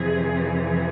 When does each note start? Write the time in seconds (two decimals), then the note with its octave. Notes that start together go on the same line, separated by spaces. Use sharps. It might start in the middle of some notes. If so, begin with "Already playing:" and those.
Already playing: F2 C3 E3 G#4
0.59 G#4